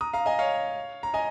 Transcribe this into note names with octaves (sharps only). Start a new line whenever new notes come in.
A#5 D#6
F5 A#5
D#5 G#5
C#5 F5
A#5
D#5 G#5